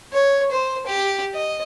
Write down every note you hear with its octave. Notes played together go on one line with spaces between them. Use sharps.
C#5
C5
G4
D#5